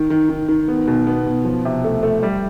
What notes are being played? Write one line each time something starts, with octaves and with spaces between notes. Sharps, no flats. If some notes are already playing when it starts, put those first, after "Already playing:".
Already playing: D#3
D#3
D#3
D#3
B3
B2
B3
B2
F3
C3
A3
A3
G3